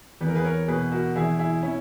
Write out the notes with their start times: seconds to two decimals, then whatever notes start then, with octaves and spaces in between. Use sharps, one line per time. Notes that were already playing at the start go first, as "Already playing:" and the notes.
0.21 E2 B4
0.28 A#4
0.35 G#4 B4
0.44 A#4 C#5
0.68 B2 G#4 B4
0.92 F#4 A#4
1.16 E2 E4 G#4
1.39 E4 G#4
1.63 C#4 E4